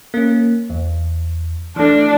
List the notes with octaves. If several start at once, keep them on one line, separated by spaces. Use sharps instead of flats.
A#3 C#4
E2
E3 A3 D4